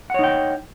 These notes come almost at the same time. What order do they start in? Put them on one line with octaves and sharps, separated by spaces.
F#5 C#5 D#4 G5